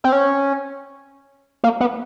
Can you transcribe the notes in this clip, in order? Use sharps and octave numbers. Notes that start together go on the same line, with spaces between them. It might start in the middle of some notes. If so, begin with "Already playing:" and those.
C4
C#4
A#3
B3